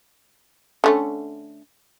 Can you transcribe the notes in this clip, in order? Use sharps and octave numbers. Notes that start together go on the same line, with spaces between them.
D3 A3 C#4